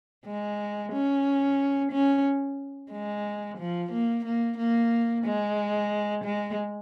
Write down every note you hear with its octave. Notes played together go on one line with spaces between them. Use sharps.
G#3
C#4
C#4
G#3
F3
A#3
A#3
A#3
G#3
G#3